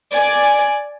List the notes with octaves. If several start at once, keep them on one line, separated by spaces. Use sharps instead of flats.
D5 G#5